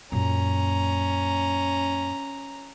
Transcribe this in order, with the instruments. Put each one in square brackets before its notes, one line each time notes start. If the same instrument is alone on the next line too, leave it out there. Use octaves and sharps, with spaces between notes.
[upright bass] F#2 A#2 [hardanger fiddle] C#4 A#5